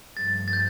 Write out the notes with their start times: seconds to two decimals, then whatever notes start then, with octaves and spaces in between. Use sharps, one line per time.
0.17 G2 F3 A3 A6
0.48 A6
0.53 G6